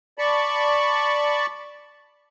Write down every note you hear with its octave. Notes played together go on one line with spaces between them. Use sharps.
D5 A5 B5 C#6